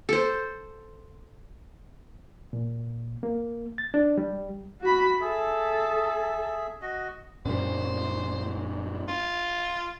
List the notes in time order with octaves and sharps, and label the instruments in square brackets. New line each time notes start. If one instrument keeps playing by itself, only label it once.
[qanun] A4 C5
[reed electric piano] A#2
A#3
A6
D4
G3
[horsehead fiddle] F#4 B5
[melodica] G#4 E5 [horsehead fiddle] A4
[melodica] F#4 D#5
[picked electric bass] F#2 A#2 G3 [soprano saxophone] C5
[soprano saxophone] F4